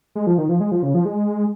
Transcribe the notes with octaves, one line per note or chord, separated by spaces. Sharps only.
G#3
F3
D#3
F3
G#3
F3
C#3
F3
G#3